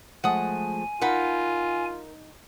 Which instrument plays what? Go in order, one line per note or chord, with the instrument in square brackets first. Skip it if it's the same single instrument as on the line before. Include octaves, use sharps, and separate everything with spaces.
[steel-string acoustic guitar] F3 G#3 A3 [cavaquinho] F#5 D#6 [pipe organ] G#5
[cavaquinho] D#4 F#5 B5 [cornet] F4 [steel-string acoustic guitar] A#4